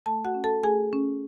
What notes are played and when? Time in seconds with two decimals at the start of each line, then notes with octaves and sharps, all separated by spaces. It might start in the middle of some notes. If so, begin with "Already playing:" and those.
0.06 A3 A4 A5
0.25 F#4 F#5
0.34 C#4
0.44 A4 A5
0.63 A3 G#4 G#5
0.93 C#4